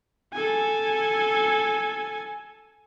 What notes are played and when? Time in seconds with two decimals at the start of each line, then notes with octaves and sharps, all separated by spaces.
0.34 A4 G#5